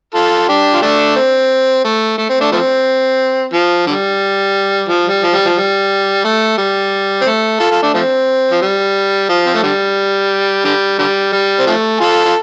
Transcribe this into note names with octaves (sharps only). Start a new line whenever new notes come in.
F4 A4
D4 G4
F4
A3 D4
C4
A3
A3
C4
A3 D4
F3 A3 C4
F3
D3 G3
F3
G3
F3
G3
F3
G3
A3
G3
C4
A3
F4 A4
F4 A4
A3 D4
F3 A3 C4
F3
G3
F3
C4
A3
D3 G3
D3 G3
D3 G3
G3
C4
C3 F3 A3
F4 A4
F4